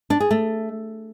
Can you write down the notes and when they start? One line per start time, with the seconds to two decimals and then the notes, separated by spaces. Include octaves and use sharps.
0.10 D4
0.20 G#4
0.31 A3